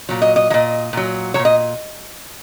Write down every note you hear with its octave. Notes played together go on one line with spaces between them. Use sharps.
A#2 F#3
D#5
D#5
A#2 F#3 D#5
A#2 F#3
F#3 C#5
A#2
D#5